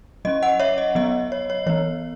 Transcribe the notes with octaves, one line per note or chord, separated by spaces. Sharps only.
F#3 C#4 D#5
D#5 F#5
C#5 E5
D#5
F#3 B3 D#5
C#5
C#5
E3 B3 C#5